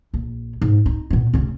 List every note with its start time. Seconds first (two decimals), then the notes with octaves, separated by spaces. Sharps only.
0.14 A#1
0.61 G#2
0.86 D#4
1.10 A#2 B3
1.34 F1 C#3